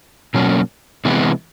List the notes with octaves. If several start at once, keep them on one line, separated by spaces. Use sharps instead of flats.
B2 F#3 A#3 C#4
C3 E3 G#3 B3 E4